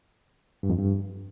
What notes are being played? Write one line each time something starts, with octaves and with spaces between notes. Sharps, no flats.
G2
F2
G2